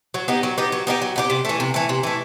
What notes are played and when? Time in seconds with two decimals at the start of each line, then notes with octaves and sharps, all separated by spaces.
0.14 F#3
0.28 B3 D#4 G4
0.43 F#3
0.58 B3 D#4 G4
0.72 F#3
0.87 B3 D#4 G4
1.02 F#3
1.16 B3 D#4 G4
1.30 C3
1.45 E3 A3
1.60 C3
1.74 E3 A3
1.89 C3
2.03 E3 A3